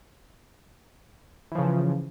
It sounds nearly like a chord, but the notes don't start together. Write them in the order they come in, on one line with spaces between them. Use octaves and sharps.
E3 F3 C#3